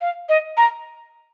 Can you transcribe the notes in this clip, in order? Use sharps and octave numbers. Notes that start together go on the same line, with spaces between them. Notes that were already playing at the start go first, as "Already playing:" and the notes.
F5
D#5
A#5